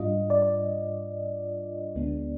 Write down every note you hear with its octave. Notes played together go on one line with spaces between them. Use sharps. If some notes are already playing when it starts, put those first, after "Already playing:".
Already playing: G#2 G3 D4 F4 D#5
D5
D5
D2 D3 G#3 B3 D4